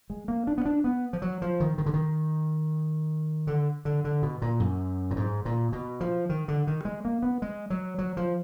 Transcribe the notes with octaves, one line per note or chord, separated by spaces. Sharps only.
G#3
A#3
D4
B3
D4
B3
F3
F#3
F3
D#3
D#3
D3
D#3
D3
D3
D3
B2
A#2
F#2
A#2
G#2
A#2
B2
F3
D#3
D3
D#3
G#3
A#3
B3
G#3
F#3
F#3
F3